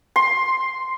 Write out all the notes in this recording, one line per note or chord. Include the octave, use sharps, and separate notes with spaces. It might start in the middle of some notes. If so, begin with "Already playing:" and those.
C6